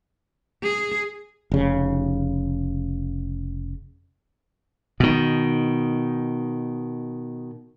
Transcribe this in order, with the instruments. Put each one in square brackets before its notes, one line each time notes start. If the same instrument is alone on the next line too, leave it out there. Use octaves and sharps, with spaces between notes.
[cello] G#4
[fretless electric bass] F1 C#3
[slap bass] B2 D#3